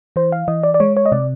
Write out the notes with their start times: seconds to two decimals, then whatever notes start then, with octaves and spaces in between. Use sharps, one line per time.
0.16 E3 C5
0.32 F5
0.48 E3 D#5
0.63 D5
0.74 D5
0.80 G#3 C#5
0.97 C#5
1.06 D#5
1.12 C3 D5